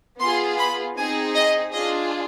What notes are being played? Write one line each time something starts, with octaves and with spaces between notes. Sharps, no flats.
B3 F4 G#4 C6
B5
C4 D#4 G#4 G#5
D#5
D4 F4 G#4 D#5